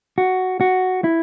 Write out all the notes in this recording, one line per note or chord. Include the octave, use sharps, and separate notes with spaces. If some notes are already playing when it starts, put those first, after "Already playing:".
F#4
F#4
E4